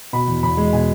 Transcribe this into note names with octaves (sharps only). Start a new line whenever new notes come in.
B2 B5
E2
E2 B5
G#3
B2 G#5